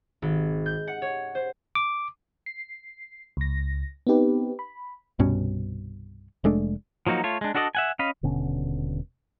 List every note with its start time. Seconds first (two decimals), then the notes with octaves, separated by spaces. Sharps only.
0.22 G#1
0.66 G6
0.88 F#5
1.02 C#5
1.35 C5
1.75 D6
2.46 C7
3.37 C#2 A#6
4.07 B3 C4 D#4 G4 B4
4.59 B5
5.19 C2 G2 B2 C#4
6.44 F1 G#3 A3 D4
7.07 F3 F#3 A#3 D#4 F#4
7.24 A3 F4 C#5
7.41 G#3 D4
7.55 D4 F#4 A4 D5 D#5
7.75 E5 F#5 G#5
7.99 C#4 D#5 F5 B5
8.23 D#1 B2 D3 C#4